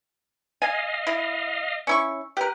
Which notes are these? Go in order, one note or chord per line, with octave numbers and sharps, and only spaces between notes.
D#5 F5 G#5
E4
C#4 E4 C#6
G4 A#4 B4